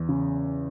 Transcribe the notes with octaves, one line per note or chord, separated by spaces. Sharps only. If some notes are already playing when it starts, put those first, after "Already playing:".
Already playing: E2
C#3